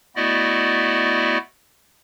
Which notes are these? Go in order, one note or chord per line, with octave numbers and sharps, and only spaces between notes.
A3 B3 E4 F#4 D5 D#5